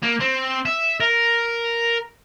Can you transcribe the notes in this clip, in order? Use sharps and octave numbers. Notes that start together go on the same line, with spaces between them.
A#3
C4
E5
A#4